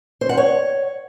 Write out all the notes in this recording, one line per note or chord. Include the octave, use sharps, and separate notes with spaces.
C5
F#5
C#5